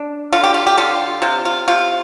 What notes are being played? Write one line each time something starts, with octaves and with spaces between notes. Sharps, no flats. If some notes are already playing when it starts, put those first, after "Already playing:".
Already playing: D4
D3 F4
G4
F4
G4
D3 F4
C3 F4
F4
C3 F4